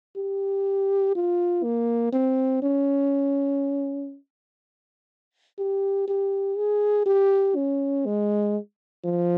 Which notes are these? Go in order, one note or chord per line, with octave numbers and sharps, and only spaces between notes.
G4
F4
A#3
C4
C#4
G4
G4
G#4
G4
C#4
G#3
F3